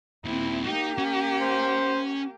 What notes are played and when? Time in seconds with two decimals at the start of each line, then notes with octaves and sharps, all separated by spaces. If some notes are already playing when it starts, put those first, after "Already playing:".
0.25 D#2 A#2 C4 E4
0.65 A#3 D#4 G4
0.98 C#4
1.41 C5